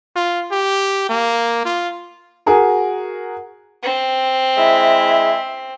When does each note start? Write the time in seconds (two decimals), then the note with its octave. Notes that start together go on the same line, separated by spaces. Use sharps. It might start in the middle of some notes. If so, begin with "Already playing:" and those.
0.16 F4
0.52 G4
1.09 A#3
1.65 F4
2.46 F#4 G#4 A#4
3.83 C4
4.57 G#3 E4 E5